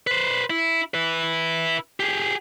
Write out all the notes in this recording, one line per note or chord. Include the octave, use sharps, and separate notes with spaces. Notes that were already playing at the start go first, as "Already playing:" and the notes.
B4 C5
E4
E4 B4
G4 G#4